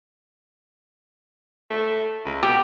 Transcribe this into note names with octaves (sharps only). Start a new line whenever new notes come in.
A3
C#2
B2 G4